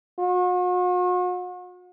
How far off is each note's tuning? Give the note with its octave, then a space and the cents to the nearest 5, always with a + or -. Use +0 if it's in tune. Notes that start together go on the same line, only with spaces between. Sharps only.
F#4 -45